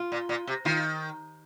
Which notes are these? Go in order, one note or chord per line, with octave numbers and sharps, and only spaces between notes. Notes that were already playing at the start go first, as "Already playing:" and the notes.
Already playing: F4
A#2
A#2
C3
D#3 F4